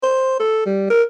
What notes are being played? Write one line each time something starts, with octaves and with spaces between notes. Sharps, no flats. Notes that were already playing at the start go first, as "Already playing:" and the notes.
C5
A4
G3
A#4